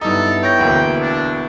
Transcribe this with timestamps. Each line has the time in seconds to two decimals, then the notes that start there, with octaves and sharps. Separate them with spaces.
0.01 G2 B3 D#4 E4 A4
0.43 C#5 G5 A#6
0.58 E1 D2 A#3
1.02 D4